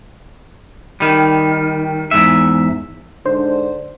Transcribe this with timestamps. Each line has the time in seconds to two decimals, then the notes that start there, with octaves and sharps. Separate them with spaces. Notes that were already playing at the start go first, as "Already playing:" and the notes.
1.00 D#3 G3
2.11 E2 G#2 E5
3.26 G#2 D3 D4 C5